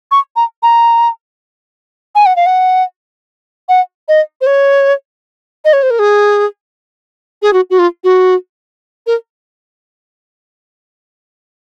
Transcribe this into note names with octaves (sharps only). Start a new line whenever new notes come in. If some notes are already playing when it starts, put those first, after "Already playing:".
C#6
A#5
A#5
G#5
F#5
F5
F#5
F#5
D#5
C5
C#5
D#5
C#5
C5
A#4
G#4
G#4
F#4
F#4
F4
F#4
A#4